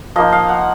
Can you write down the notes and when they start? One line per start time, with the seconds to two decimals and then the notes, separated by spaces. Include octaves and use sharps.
0.16 F3 A#3 D#4 D#5
0.32 F5
0.49 F#5